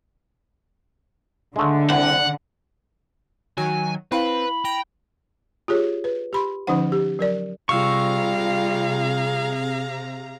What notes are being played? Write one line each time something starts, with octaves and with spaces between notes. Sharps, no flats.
D3 G#3 A3
C2 F#5
D#3 F#3 G#5
C4 E4 B4 F5 B5
G5 A#5
F4 G4 G#4 C#5
B4
G4 B5 C6
D3 F3 C#4 D#4 C5 F#5
G4
F#3 A#4 D5
C3 G3 F4 G#4 F5 A#5 C#6 E6